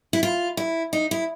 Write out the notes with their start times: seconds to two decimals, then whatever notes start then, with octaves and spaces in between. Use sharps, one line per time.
0.13 E4
0.23 F4
0.57 E4
0.93 D#4
1.11 E4